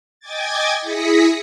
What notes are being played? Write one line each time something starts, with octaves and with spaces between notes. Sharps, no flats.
D#5 G5 G#5 D6 G#6 A6
E4 G#4 D#6 A#6 B6 C#7